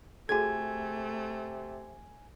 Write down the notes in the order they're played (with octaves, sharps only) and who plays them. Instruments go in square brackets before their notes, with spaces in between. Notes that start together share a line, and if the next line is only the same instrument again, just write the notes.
[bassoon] C3 [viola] A3 [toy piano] F#4 G#4 A4 [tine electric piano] G#5 G#6